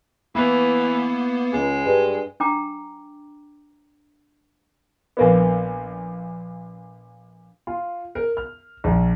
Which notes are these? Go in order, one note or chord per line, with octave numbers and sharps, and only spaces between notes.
E3 A#3 B3 E4 B4
C#2 G#3
G2
D4 G5 A#5 D6
A#1 A#3 B3
F4
A#4
F6
A#1